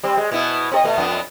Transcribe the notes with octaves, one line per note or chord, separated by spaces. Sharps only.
G3 C4
G#3
B2 B3 E4
C4 A4 D#5
B2 A3 B3
F2 B3 D4